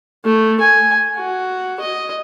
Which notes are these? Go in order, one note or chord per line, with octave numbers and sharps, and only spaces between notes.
A3
G#5
F#4
D#5